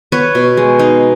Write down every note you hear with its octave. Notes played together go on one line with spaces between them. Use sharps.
B3 B4 C#5
B2
G#3
D#4